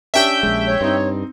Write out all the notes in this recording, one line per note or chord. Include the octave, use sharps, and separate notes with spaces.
C#4 D4 G4 E5 G5 G6
A#1 G#3
C#5
G2 C4 D#4